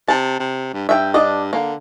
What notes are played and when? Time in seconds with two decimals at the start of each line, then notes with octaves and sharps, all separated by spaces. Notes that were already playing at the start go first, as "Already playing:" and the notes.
0.08 C3 A5
0.39 C3
0.73 G2
0.89 G2 E5 G5
1.14 D4 D#5
1.53 D3 A#3